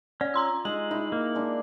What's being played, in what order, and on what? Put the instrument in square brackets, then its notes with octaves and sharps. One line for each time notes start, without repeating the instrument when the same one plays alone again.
[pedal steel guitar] C#4 [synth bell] D5
[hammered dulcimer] F4 [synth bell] A#5 C6 E6
[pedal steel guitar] G#3 [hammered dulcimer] D#4 G4 G#4 [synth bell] F#7
[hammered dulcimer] D#4 E4
[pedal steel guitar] A#3
[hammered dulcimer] G#3 D4